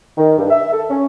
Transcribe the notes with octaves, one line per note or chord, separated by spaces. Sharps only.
D#3
G2
E5
A4
C#4